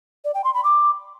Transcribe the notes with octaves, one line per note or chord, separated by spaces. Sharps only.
D5
G5
C6
B5
D6